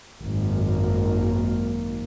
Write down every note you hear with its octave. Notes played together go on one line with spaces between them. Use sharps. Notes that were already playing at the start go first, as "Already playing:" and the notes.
G#1 F#2 A#3